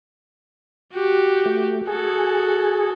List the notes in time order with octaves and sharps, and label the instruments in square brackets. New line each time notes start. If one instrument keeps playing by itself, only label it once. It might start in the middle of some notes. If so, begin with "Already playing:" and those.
[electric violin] F#4 G4
[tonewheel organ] A3
[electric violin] F#4 A4 [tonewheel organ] G#4